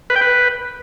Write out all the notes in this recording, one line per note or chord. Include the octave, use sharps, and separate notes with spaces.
B4
G5
B4